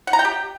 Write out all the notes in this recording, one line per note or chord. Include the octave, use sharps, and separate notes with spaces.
F#5
A#5
G5
G4